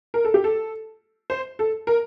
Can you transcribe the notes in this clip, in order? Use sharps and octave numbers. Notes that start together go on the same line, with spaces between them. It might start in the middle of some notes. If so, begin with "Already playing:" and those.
A#4
A4
G4
A4
C5
A4
A#4